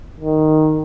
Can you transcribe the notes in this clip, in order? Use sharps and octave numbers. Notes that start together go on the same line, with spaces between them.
D#3